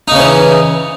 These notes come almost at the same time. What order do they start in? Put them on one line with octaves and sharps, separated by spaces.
D#4 C#3 C#4 E3